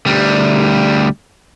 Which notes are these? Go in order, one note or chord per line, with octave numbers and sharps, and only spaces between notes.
D2 G3